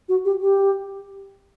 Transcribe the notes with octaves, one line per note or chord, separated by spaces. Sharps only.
F#4
G4
G4